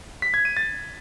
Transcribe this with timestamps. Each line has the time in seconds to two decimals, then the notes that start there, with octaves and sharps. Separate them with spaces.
0.22 B6
0.34 G#6
0.45 D#7
0.57 A6